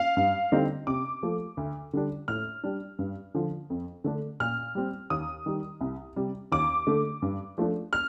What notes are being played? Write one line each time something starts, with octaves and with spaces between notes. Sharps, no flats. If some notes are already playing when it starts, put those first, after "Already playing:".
Already playing: F5
G2
D3 G3 C4 D#4
C3 D6
F3 A3
D2
D3 G3 D4
A2 F6
G3 D4
G2
D3 F3
F2
D3 A3 D4
A#2 F6
G3 C4
D#2 D#6
D#3 G3
C2
C3 G3
D#2 D6
D3 A3
G2
F3 A3 D4
F6